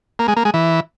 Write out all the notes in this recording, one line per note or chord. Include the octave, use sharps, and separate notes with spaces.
A#3
G#3
A#3
G#3
E3